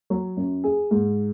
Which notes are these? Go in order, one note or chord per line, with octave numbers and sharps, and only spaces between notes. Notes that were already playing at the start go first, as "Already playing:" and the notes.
F#3
F#2
G#4
G#2